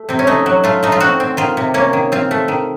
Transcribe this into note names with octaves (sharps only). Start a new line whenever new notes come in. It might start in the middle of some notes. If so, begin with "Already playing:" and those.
Already playing: A3
C3 C4
C#4
A3 D#4
F#3
A3 F4
A3 D#4
F4
C4 F#4
C4
D#3 F4
C3
A#3 C#4
D#3
C4 F4
A3
D#3